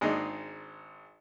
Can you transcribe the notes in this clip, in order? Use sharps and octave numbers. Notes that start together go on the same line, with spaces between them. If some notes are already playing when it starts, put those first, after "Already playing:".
G#1 G#3 D4 D#4 D#5